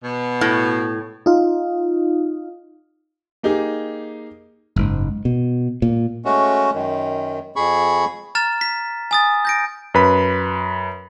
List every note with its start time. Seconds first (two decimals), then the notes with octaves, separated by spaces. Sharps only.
0.03 B2
0.41 A2
1.26 D#4 F4
3.43 A#3 D#4 G4 G#4
4.76 F#1 G#2
5.25 B2
5.82 A#2
6.25 G#3 A3 C#4 F#4
6.74 F#2 D#3
7.56 F2 G#4 B5 C#6
8.35 A#5 F6 A6 E7
8.61 B6
9.11 G#5 D#6 A6
9.45 G6 A#6 D7
9.94 F#2 B4 B5